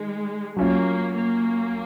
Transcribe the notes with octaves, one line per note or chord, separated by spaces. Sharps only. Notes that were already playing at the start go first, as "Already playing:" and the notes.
Already playing: D#3 G#3
F#3 A#3 C#4 F4
A#3